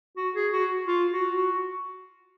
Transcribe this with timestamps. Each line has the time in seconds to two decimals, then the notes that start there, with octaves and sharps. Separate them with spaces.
0.17 F#4
0.34 G#4
0.52 F#4
0.88 F4
1.11 F#4
1.35 F#4